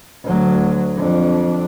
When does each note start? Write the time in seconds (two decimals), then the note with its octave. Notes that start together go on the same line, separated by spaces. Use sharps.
0.24 D2 F#3
0.96 F2 D4